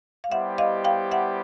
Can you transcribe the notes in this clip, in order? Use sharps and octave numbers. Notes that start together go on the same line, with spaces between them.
F5
G3 B3 E4 G4 C5 E5 F#5
D#5 F5
F5 G5
E5 F#5